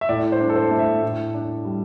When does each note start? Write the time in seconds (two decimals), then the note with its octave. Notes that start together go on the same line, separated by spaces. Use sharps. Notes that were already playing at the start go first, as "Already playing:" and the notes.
0.01 E5
0.09 A2 D5
0.32 C5
0.40 D4
0.49 A4
0.55 C5
0.71 A3
0.79 E5
1.02 A2
1.34 D4
1.65 G3